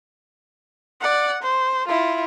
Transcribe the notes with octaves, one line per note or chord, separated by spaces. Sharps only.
D5 F#5
C5
E4 F4